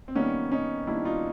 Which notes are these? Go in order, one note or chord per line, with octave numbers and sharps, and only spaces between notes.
C4
D#3 G3 A#3 B3 C#4
C#4 D#4
D#3 G3 A#3 D4 E4
D#4 F4